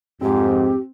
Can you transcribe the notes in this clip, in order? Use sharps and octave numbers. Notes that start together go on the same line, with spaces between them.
F2 G#2 C4 G4